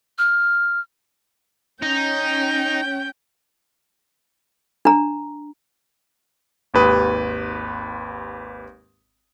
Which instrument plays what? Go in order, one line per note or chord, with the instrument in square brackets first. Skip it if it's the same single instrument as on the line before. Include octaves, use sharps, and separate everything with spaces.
[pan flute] F6
[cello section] C#4 [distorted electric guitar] D#4 [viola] G5
[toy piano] D4 A#5
[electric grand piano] G#1 D#2 G4 B4 D#6